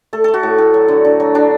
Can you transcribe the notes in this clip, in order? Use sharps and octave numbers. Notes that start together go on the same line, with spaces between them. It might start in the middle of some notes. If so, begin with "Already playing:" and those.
A3 A4
A3 A4
F#4
A2
A2
F#3
D3
D3
F#3
F#3 D4